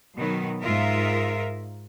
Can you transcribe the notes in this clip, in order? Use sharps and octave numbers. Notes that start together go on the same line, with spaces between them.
B2 D#3 F#3 B3
G#2 D#4 F4 A#4 E5